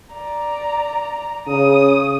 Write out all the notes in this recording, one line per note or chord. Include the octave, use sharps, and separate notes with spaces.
D5 A#5
C#3 D#6